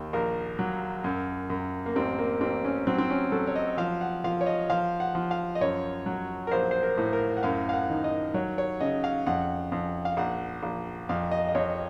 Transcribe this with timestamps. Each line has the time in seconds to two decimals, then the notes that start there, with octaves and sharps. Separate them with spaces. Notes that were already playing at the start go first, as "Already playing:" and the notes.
Already playing: D#2
0.13 A#1 A#4
0.59 F#3
1.04 F#2
1.50 F#2
1.86 A#3
1.96 A1 C4
2.19 A#3
2.41 A1 C4
2.64 C#4
2.87 F#3 C4
2.98 C4
3.10 C#4
3.32 F#3 A4
3.47 C#5
3.56 D#5
3.77 F3 F5
4.01 F#5
4.24 F3 F5
4.41 C#5
4.46 D#5
4.70 F3 F5
5.00 F#5
5.15 F3
5.31 F5
5.55 D#5
5.61 F#2 C#5
6.06 F#3
6.47 A#4
6.51 A#1 C5
6.71 C5
6.83 A#4
6.98 A2
7.13 A#4
7.37 F#5
7.43 F#2 F5
7.69 F5
7.73 F#5
7.90 D#3
8.04 D#5
8.34 F#3 C#5
8.58 C#5
8.80 C#3 D#5
9.04 F5
9.27 F2 F#5
9.72 F2
10.05 F5
10.17 A#1 F#5
10.63 A#1
11.09 F2 F5
11.31 D#5
11.48 D#5
11.55 F2 C#5